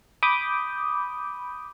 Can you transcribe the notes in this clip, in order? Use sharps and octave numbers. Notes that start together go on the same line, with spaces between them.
B5 D6 D#6 G6